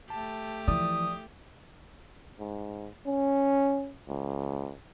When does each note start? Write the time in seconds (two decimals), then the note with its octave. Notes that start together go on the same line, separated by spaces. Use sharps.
0.10 A3 G4 A5
0.68 E3 F3 D5 D#6
2.40 G#2
3.06 C#4
4.08 C#2